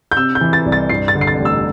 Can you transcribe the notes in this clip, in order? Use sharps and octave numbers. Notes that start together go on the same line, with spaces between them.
G6
C3 E6
G6
E3
A6
C2
A6
G2 C7
A6
D3
C7
A6
A1
E6